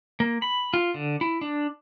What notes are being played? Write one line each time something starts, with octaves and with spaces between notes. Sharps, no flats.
A#3
B5
F4
D3
E4
D4